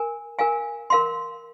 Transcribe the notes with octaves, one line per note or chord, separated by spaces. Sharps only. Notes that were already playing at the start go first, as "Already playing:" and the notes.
Already playing: A#4 G#5
A#4 F5 G#5
A#4 F5 C6